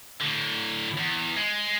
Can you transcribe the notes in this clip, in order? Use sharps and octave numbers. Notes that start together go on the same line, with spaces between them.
A2 D3
E2
G#3